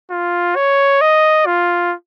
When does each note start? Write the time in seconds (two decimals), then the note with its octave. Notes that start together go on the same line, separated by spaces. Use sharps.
0.11 F4
0.56 C#5
1.01 D#5
1.46 F4